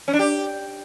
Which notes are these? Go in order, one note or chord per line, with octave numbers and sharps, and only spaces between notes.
C#4
D4
G4